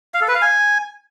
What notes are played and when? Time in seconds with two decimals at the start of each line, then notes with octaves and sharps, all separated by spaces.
0.14 F5
0.21 A4
0.28 B4
0.35 F5
0.42 G#5